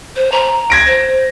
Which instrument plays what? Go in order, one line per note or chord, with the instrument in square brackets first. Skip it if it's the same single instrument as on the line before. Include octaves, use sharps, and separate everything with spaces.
[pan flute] C5
A#5
[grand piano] G#6 A#6 D7
[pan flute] C5